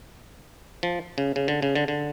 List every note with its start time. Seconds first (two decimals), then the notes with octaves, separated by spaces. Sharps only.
0.83 F3
1.18 C#3
1.36 C#3
1.48 D3
1.62 C#3
1.75 D3
1.88 D3